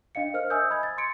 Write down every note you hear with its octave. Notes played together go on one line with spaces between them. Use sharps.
D4 D#5 F5 C#7
A#4 C5 F6
D#5 E5 G#5 D#6 E6 G6
B5 G#6
A6
C6 G#6 C#7 D7